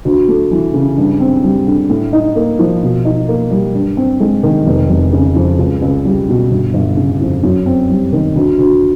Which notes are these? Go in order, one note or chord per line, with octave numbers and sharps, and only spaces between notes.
D2
A3
E3
C#3
G2
C4
G3
D3
A2
D#4
A#3
F3
B2
D#4
A#3
G3
G2
C4
G#3
D#3
F1
F1
C#3
F2
C#2
C#2
G3
B2
G1
G1
C#3
F2
F#2
C4
G3
D#3
D2
D2